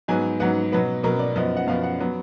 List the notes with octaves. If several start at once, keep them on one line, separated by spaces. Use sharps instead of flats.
G#2 F#3 B3 G#5
G#2 F#3 B3 F#5
B2 F#3 B3 B4
B2 F#3 B3 A#4
D5
F#2 F3 B3 D#5
F#5
F#2 F3 B3 F5
F#5
F#3 B3